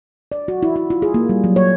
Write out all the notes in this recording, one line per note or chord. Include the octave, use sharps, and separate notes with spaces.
D5
F#4
E4
E4
F4
G#4
A#3
G3
F#3
C#5